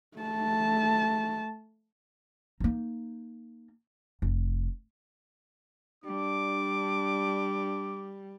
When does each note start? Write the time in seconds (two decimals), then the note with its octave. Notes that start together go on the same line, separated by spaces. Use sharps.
0.18 A3 A5
2.60 A#3 D#4
4.22 F1
6.04 G3 D4 D6